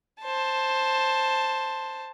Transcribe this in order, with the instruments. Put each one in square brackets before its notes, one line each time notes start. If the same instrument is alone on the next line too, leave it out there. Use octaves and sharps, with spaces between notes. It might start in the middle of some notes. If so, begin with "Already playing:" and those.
[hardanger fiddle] C5 A5